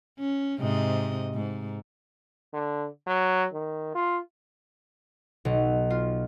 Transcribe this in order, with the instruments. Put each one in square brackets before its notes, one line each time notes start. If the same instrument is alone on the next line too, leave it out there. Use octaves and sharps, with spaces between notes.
[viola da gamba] C#4
G#2 C3 D#5
G#2
[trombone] D3
F#3
D#3
F4
[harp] B1
F4